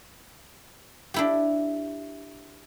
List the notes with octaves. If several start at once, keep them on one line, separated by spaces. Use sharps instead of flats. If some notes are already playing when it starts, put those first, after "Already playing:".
D4 E4 G4